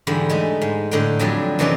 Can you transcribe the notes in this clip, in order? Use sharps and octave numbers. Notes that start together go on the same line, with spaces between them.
E2 G#2 D3 G3 B5
G#3 A3 D#4
G#2
A2 D3 D#4 F#5 G5
F2 F#3 G3 D4 G#5 A5
F#2 C3 E3 F#3 D#4 D5